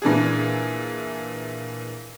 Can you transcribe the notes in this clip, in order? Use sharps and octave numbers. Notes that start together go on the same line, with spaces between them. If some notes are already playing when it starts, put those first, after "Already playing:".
A#2 E3 D4 G#4